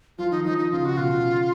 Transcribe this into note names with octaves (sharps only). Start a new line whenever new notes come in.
F3 F4
D#3 D#4
F3 D#4
D#4
C#3 F4
F#4
B2 F4
C#3